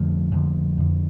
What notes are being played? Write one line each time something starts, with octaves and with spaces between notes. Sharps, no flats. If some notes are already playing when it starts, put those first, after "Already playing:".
Already playing: F2 D3 F3 A3
F2 D3
F2 D3